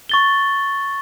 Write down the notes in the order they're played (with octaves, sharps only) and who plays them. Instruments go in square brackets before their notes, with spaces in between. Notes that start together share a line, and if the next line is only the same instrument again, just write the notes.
[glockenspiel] C#6 A6 G7